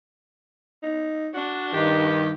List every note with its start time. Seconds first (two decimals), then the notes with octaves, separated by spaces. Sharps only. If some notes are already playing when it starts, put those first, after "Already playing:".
0.83 D#4
1.34 D4 F#4
1.74 G2 D#3 G4